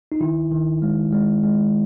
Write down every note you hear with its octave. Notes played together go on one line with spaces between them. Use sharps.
D#4
D#3 E4
D#3
G#3
G#3
G#3